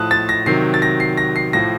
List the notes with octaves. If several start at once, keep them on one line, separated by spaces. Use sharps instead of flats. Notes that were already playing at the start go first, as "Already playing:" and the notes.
Already playing: A2 F3 A5 D#6 F#6
A6
A#6
C3 D#3 F#3 C7
A6
A#6
C7
A#6
C7
A2 F3 A#6